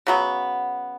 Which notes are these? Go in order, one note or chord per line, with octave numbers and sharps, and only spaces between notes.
C#3 F#3 B3